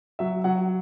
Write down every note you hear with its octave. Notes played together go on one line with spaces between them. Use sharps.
F#3 E5
F#3 F#5